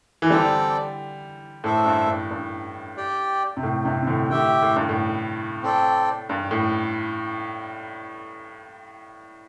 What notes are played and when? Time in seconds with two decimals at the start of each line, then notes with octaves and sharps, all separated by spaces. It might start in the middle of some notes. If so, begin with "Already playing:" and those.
0.22 E3
0.30 D3 G3 C4 A4 D5 G5
1.64 A2 D4 A4 C5 E5
1.86 G2
2.08 G2
2.31 G2
2.97 G4 D5 G5
3.57 C3
3.63 A2
3.85 G2 C3
4.02 C3
4.07 A2 D3
4.30 A2 D3 G4 E5 G5
4.62 A2
4.76 G2
4.89 A2
5.63 C4 A4 D5 G5
6.29 G2
6.51 A2